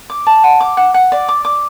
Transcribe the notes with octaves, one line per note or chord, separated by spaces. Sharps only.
D6
A5
F#5
D6
F#5
F#5
D5
D6
D6